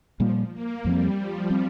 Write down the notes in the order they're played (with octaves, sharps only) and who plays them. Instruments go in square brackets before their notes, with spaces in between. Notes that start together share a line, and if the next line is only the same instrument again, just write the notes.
[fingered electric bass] A#2 G3 A#3 [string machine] F3
[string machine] A#3
[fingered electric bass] F2 F3 C4 [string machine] G3
[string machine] F3
[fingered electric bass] G3 C4